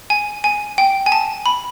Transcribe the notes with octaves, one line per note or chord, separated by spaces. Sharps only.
G#5
G#5
G5
G#5
A5
B5